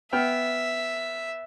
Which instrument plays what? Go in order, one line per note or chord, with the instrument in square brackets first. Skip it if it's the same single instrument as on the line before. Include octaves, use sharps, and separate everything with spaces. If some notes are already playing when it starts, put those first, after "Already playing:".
[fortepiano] B3 G5 F6 [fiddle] E5